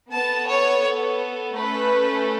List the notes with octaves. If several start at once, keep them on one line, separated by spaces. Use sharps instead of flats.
B3 A4 A5
C#5
A3 C#4 A4 B4